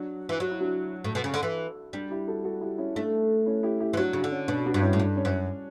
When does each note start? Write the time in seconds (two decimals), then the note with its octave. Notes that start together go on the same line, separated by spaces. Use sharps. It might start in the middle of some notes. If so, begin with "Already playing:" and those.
Already playing: F#3 D4 F#4
0.29 E3
0.40 F#3 F#4
0.51 E4
0.61 D4 F#4
1.04 A2
1.15 B2
1.24 C#3
1.34 D3
1.43 E3
1.93 G3 D4
2.10 E4 G4
2.28 F#4 A4
2.44 F#4 A4
2.61 E4 G4
2.78 C#4 E4
2.95 A3 D4
3.46 C#4 E4
3.63 E4 G4
3.80 E4 G4
3.93 E3
3.97 F#3 D4 F#4
4.13 C#3 D4
4.24 D3
4.31 C#4
4.48 B2 D4
4.66 D4 F#4
4.74 G2
4.82 C#4 E4
4.93 A2
5.00 G2 D4
5.17 C#4
5.25 F#2